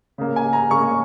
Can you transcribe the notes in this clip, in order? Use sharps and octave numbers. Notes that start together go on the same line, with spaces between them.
C#3 A#3
G#5
A#5
C#3 A#3 C#6